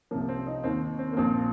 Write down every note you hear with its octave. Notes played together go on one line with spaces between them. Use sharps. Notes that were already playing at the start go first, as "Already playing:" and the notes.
C2 C3 F3 A#3
C4
D#4
D#2 D#3 C4
C4
A#3
A#1 A#2 F3 C4